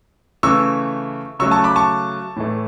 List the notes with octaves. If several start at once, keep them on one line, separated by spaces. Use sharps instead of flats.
C#3 E3 A3 C#6 E6
C#3 F#3 A3 C#6 E6
A5 C#6
B5 D6
A5 C#6
A2 E3 A3